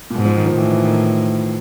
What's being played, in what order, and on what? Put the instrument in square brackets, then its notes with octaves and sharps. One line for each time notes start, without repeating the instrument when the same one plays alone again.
[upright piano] A#2
[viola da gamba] G#2 [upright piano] B2
[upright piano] F3
D#3
F3
[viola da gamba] A2 [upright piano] E3
[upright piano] E3
D#3